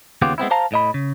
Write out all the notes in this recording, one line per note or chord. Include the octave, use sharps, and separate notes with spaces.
D#2 C#3 B3 F4 G4
G#3 B3 C4 E4
C5 F5 A5 A#5
A2 D#5 B5
C#3